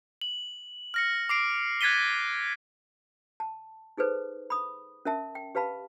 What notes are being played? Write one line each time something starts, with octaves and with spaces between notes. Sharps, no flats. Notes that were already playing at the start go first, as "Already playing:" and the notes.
F#7
F6 A#6 C#7
D6 C7 D7
F#6 G#6 A6 B6 D#7 G7
A5
D#4 G#4 A4 B4 C5
B5 D#6
C#4 A#4 E5 A5
G5
G4 B4 F5 A5 B5